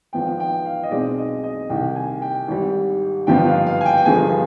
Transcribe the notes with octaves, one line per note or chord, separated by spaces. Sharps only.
G#1 G#2 F3 B3 G5
G5
F5
D#5
B1 B2 G#3 C4 D5
D#5
D#5
C2 C3 D#3 G5
G#5
G5
G#1 G#2 G3
G#1 G2 D3 F3 B3 G5
F5
F5
G#5
G5
G5
G1 G2 F3 G#3 B3 G#5